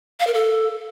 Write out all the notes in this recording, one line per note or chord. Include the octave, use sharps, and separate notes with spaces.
F5
A#4
A4